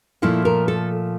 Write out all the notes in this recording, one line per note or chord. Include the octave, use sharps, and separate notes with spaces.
A#2 F3 A3 E4
A#4
A4